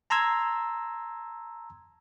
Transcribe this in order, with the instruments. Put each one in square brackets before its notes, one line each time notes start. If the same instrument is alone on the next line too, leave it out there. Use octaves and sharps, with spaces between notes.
[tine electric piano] A5 A#5 C6 E6 G#6